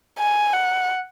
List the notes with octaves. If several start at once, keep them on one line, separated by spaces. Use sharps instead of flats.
G#5
F#5